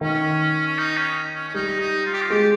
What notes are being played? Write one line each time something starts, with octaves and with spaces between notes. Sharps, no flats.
D#3 C#4
C#4
D#4
C#4
C#4
C#4
G3 D#4
D#4
F4
G4
F4
G#3 G4